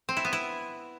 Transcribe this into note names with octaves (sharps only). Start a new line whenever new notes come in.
C4
E4
B3
E4